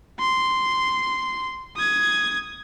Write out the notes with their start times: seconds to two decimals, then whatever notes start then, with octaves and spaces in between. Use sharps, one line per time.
0.19 C6
1.76 D#6 G#6